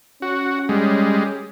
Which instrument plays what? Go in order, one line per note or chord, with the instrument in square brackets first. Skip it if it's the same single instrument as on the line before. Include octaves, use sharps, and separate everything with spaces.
[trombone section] C#4 [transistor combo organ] F#4
[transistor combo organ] G3 G#3